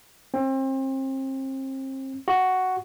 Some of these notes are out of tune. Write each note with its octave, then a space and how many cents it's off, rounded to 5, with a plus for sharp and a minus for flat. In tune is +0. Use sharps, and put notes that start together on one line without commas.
C4 +35
F#4 +5